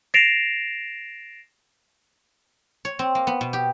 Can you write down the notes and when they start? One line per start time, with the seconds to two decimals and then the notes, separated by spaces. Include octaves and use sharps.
0.14 A6 A#6 C7 D7 E7 F7
2.85 C#5
2.99 C4
3.15 A#3
3.27 B3
3.41 B2
3.53 G4